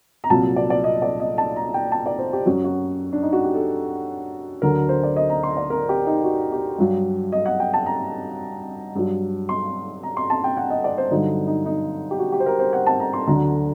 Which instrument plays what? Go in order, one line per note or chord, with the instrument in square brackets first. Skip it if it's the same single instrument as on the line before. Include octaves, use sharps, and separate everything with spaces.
[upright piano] A#5
C2 A#2 F#3 A5
D5
D5
D#5
D5
D#5
A5
A#5
G5
A5
D5
C5
G4
F#2 F#3 F#4
F#4
D4
D#4
F#4
G4
A4
D2 D3 F#3 A#4
C5
D5
D#5
A#5
C6
D5
A#4
G4
D#4
F#4
G4
G2 F#3
D#5
F#5
G5
A5
A#5
G2 F#3
C6
A#5
C6
A5
G5
F#5
D#5
D5
C5
G2 D3 F#3 D#4
D#4
D#4
G4
F#4
G4
C5
A#4
C5
F#5
A5
A#5
C6
D2 D3 F#3 A#5